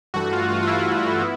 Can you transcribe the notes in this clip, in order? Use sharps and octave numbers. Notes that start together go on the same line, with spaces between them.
G2 E3 A3 F#4
F4
F4
F4
E4
B3